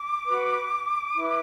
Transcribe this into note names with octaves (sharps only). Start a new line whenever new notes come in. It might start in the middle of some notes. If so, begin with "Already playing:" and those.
Already playing: D6
F#4 B4
E4 B4